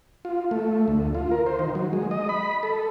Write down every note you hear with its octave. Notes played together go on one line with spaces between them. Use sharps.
F4
A3
D2
F4
A#4
C5
D#3
F#3
G#3
D#5
B5
A4